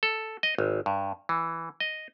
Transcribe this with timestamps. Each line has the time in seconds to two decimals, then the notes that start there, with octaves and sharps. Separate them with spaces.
0.03 A4
0.43 D#5
0.58 G#1
0.86 G2
1.29 E3
1.80 D#5